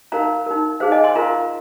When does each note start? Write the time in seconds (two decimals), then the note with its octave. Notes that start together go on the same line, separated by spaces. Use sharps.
0.12 D#4 A#4 F5 A#5
0.46 D#4 A#4
0.80 D#4 G#4 C5 F5
0.92 D#5 G#5
1.04 G#5 C6
1.15 F4 A#4 F5 A#5